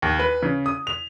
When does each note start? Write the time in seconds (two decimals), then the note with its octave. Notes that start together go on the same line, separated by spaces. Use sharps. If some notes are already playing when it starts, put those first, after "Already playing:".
0.02 D#2
0.19 B4
0.43 C#3
0.66 D#6
0.87 F7